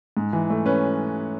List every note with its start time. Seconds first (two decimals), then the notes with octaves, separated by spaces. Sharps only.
0.17 G#2
0.33 E3
0.50 A3
0.66 C#4 B4